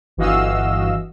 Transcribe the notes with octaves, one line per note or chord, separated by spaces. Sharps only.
G1 E3 F#4 D#5 F5 E6